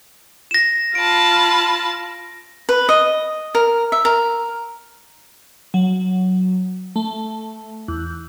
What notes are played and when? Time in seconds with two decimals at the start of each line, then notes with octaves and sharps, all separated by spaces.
0.51 A#6 E7
0.95 F4 A5 B5 D7
2.69 B4
2.89 D#5
3.55 A#4
3.92 E5
4.05 A#4
5.74 F#3
6.96 A3
7.88 E2